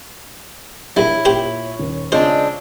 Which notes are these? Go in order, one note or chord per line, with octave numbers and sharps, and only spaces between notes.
A#1 G3 E4 C#5
A#2 G4 C5 G5 F#7
D#1
C#3 G#3 C4 D4 F4 C5 C#5 D#5